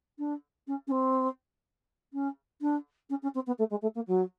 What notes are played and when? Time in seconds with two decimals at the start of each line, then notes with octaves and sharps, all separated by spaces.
0.18 D4
0.67 C#4
0.87 C#4
0.91 C4
2.13 C#4
2.61 D4
3.09 C#4
3.22 C#4
3.34 C4
3.46 B3
3.58 A3
3.70 G#3
3.81 A3
3.95 A#3
4.07 F#3